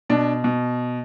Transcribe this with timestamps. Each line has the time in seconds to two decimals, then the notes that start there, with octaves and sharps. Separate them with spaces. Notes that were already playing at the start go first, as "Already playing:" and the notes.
0.10 B2 D4
0.44 B2